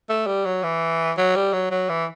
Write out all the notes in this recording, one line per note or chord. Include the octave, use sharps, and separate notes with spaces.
A3
G3
F#3
E3
F#3
G3
F#3
F#3
E3